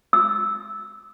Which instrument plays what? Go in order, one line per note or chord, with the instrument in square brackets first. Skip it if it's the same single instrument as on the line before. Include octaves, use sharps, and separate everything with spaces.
[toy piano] E6